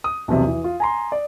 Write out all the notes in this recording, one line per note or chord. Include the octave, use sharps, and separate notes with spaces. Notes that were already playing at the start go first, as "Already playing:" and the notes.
D#6
B1 E2 C3
E3
F4
G#5 A#5 C6
D5